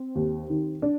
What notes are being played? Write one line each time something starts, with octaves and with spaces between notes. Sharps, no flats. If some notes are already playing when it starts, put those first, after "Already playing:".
Already playing: C4
D#2
D#3
D4